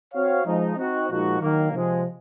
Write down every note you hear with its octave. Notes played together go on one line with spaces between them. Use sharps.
C4 F#4 C#5 F5
F3 G#3 D#4
C4 D#4 F#4
A#2 F3 G#3 D#4 F#4
D#3 F#3 A#3
C3 F3 G#3